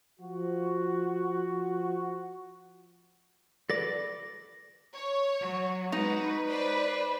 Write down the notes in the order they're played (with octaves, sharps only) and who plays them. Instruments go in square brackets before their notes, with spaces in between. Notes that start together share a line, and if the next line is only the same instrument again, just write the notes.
[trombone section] F3 F#4
[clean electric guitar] A4 B4 D5 [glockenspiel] A#6
[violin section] C#5
[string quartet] F#3
[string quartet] G#3 F#4 [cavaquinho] D#4 [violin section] B4
[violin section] B4 D5 [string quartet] C5